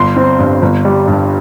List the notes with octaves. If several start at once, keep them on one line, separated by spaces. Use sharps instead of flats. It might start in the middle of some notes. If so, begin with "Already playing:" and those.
Already playing: G1 C6
C4
G2
G1
G3
G2